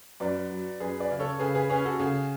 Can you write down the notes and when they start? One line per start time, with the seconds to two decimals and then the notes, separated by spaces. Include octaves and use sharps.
0.20 F#2 B4 D5
0.50 F#3
0.80 F#2 G#4 B4
1.00 B4 D5
1.11 C#3
1.20 A4 C#5
1.39 C#3 G#4 B4
1.55 G#4 B4
1.69 C#4 G#4 B4
1.85 F#4 A4
2.00 C#3 G#4